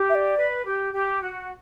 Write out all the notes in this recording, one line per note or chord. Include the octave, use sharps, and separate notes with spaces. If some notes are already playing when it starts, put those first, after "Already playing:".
Already playing: G4
E5
D5
B4
G4
G4
F#4